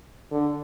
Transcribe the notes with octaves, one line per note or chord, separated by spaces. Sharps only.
D3